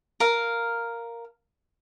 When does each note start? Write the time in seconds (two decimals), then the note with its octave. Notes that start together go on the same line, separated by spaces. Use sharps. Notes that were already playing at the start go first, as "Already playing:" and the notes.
0.20 A#4 F5